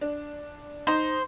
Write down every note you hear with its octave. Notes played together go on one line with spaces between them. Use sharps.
D4
D#4 C5